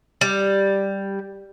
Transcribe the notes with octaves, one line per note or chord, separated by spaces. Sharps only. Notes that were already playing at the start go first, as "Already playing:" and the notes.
G3